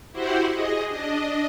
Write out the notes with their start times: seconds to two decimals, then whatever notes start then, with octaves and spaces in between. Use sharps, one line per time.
0.12 E4 F#4 G4 C5 F#5
0.51 G#4 D#5
0.89 D4 D#5